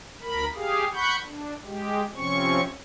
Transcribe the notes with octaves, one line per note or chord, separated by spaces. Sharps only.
D2 A#4 B5
G4 G#4 F5
F#5 B5 C#6 G6
D4
G#3 G4
C3 F3 C4 C#4 C#6